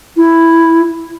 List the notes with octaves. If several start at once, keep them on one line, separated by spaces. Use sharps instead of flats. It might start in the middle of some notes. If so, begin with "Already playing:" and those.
E4